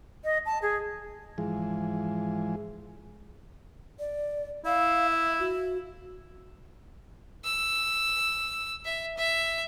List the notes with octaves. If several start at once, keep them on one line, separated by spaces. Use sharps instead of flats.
D#5
A5
G#4
G#2 E3 F3 G#3
D5
E4 F5
E5
F#4
E6
E5
E5